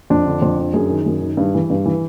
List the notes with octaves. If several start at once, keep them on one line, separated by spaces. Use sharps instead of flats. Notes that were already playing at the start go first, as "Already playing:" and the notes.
F2 D4
D3
F2
D3
F#2 G#4
D#3
F#2
D#3
G2
E3
G2
E3